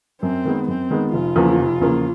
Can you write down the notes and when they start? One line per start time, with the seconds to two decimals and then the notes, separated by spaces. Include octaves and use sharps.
0.22 F#2 C4
0.45 D#3 G#3 B3
0.68 F#2 C4
0.91 D#3 G#3 B3
1.13 F1 F4
1.36 E2 C#3 F3 A#3
1.59 F1
1.81 E2 C#3 F3 A#3